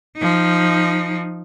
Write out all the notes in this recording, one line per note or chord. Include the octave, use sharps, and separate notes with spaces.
F3 D#4